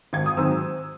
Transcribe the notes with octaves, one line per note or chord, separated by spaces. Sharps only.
G#1 G#6
D#6
G#2 D#3 F#3 C4 E6